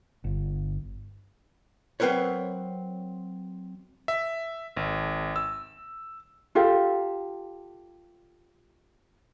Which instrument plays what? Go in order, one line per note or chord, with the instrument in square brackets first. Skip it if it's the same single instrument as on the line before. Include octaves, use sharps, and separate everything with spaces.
[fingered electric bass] G1
[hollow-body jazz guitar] F#3 C4 A#4 B4 C#5
[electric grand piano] E5
G#1
E6
[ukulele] F4 G4 A4 F5